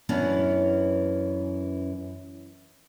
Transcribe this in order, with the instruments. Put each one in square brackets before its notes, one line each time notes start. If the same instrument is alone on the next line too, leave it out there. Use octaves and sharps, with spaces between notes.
[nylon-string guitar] F#2 E3 B3 C#4 D4